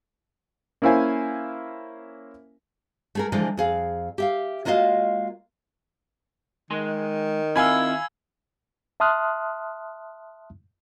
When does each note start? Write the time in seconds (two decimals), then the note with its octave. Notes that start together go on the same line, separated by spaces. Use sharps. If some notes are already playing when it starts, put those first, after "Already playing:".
0.82 A#3 C#4 E4 C5 F5 G#5
3.15 A3 G#4 A#4
3.32 D3 E3 F3 G#3 A4 A#4
3.57 F2 G#4 F5
4.18 G4 E5 F5
4.65 G#3 A#3 F4 F#4 D#5 F5
6.71 D#3 G#3 G#5 C6
7.56 C4 E4 F4 F5 G#5 B5 E6 G#6
9.00 E5 A5 C6 D#6 F6 F#6